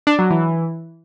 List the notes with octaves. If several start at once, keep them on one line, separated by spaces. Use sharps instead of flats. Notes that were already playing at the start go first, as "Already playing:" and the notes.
D4
F#3
E3